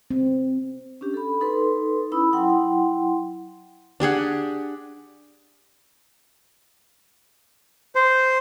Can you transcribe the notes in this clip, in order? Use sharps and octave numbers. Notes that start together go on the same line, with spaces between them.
C4
C#4 D4 G4
A4 B5
D#4 A4 B4 C6
C#4 E4 B5 D#6 E6
F#3 E4 F#5 G5 C6
D4 G4 G#4 F#5
C5